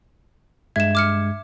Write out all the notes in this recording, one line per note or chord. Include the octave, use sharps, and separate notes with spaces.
G2 G#3 E5 G#6 E7
D6 F6 C#7